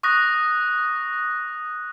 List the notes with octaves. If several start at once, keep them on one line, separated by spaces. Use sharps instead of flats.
C#6 D#6 F#6 A#6